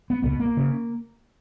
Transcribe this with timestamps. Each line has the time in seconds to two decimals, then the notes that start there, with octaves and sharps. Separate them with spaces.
0.10 B3
0.22 C#2 B2 B3
0.40 A#3
0.57 C#3